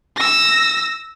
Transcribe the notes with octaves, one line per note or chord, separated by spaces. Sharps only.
E6 A#6